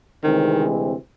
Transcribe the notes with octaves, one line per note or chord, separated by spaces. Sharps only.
D2 C3 D#3 E3 G#3 C4